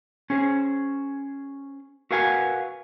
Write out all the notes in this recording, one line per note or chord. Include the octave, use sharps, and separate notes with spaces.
C#4 G#4 C5
F#4 A#4 B4 F5 F#5 G#5